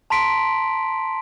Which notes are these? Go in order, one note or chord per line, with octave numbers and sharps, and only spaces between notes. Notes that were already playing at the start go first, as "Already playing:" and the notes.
A5 A#5 C6 B6 D7